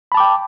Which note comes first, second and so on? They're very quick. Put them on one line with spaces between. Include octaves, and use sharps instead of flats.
B5 A5 D6 G5